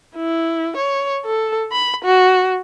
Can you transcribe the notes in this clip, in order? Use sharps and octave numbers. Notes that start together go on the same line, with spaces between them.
E4
C#5
A4
B5
F#4